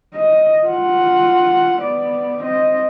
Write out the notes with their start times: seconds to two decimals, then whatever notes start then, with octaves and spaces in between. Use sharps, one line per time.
0.15 D#5
0.65 F4 F#5
1.81 B3 D5
2.43 C4 D#5